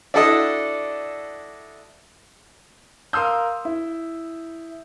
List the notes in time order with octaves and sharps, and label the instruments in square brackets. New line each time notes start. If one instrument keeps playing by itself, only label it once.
[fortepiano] D4 E4 F#4 A4 D5 D#5
[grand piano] A#4 F5 C6 D#6 E6 G6
E4